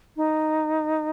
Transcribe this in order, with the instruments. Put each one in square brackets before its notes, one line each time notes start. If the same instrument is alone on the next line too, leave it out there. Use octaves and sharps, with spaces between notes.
[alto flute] D#4